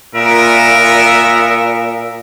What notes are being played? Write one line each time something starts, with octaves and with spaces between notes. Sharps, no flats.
A#2 B3 A#4 E5